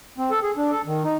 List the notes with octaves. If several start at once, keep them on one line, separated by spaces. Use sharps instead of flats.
C4
A4
G#4
D4
A4
D#3
D#4